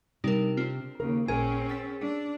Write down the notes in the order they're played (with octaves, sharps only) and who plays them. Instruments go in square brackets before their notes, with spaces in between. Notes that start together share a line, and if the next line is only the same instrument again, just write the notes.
[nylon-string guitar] C3 [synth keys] G3 D4 D7 [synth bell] D#4 A#4
[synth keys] C4 D4 [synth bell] F4
[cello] D#2 C#3 [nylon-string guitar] A#4
[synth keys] A1 A#2 [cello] C4 C#4 [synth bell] G#4 [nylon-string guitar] A#4 G#5
[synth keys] E6 A6 B6
[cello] D4